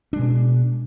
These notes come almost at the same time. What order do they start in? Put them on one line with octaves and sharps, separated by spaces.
D4 G#3 B2